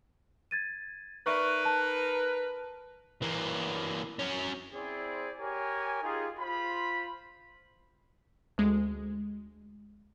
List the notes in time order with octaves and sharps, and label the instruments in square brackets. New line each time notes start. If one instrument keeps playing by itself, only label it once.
[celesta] G#6 A6 D#7
[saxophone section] D#4 A#4 B4 [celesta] D5 E5 C#6
[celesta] A5
[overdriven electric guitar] E3 A#3
F#3 C#4
[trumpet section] C4 E4 G#4 C5 D5
G4 A#4 C#5 G#5
D#4 F4 G4 G#4
F4 C5 B5
[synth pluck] D2 G#3